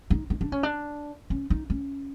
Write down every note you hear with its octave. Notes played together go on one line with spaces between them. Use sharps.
D#4
D#4
D4
C#4
D4
C#4
D#4
C#4